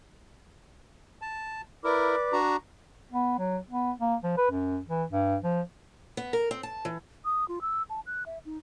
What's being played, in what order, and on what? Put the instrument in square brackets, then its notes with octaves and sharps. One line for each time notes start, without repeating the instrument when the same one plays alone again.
[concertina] A5
[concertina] E4 A#4 [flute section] B4 D5 D6
[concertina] D4 F#4 A#5
[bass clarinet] B3
F#3
B3
A#3
F3
B4
F#2
E3
G2
F3
[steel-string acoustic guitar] B3
A#4
C4
A5
E3
[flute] D#6
F4
E6
A5
F#6
E5
D#4